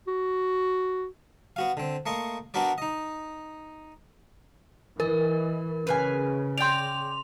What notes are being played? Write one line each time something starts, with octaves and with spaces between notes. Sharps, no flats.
F#4
B3 F#4 F5
D3 C4
A3 A#3 D#5 C6 C#6
B3 D4 F#4 A#4 B4 D5
D#4 D#5
E3 A#4 D#5
C#3 B4 F5 G#5
D5 G5 C6 F7